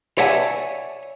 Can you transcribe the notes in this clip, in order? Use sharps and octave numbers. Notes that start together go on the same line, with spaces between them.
C#5 D5 E5 F#5 G#5 A5